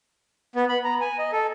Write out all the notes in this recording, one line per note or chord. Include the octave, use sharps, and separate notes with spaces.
B3
B5
A#5
G#5
D#5
A4